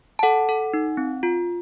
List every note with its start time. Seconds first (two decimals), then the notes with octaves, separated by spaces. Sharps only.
0.19 A5
0.23 A4 F#5
0.49 A4
0.73 D#4
0.97 C4
1.23 F4